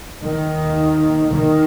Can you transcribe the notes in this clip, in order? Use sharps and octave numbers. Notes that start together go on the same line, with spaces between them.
D#2 D#3
D#3